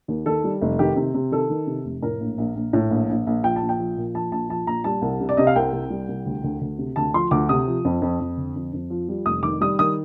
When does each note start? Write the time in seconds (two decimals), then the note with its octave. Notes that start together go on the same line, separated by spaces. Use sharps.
0.08 D#2
0.26 D#3 A4
0.44 G3
0.62 F1
0.79 D#3 G4
0.96 C3
1.14 C3
1.32 D#3 A4
1.50 D#3
1.67 C3
1.85 F1
2.02 A2 A#4
2.21 A#1
2.38 A#1
2.55 A#1
2.73 A2
2.91 A#1
3.09 A#1
3.27 A#1
3.43 F3 G5
3.56 A5
3.61 A#1
3.69 G5
3.79 F3
3.97 A#2
4.14 F3 A5
4.32 A#1 A5
4.49 F3 A5
4.67 A#1 A#5
4.84 G3 A5
5.02 C2
5.20 C3
5.29 D5
5.37 C3 D#5
5.47 F5
5.56 C2 G5
5.73 C2
5.90 G3
6.08 C2
6.26 D2
6.44 D2
6.61 D2
6.78 C3
6.96 D2 A5
7.14 F3 C6
7.31 D2 D6
7.49 C3 D#6
7.67 F3
7.85 F2
8.02 F2
8.20 F2
8.37 D3
8.56 F2
8.73 F2
8.90 F3
9.09 G3
9.25 F1 D#6
9.43 D#3 D6
9.61 G3 D#6
9.79 D#3 D#6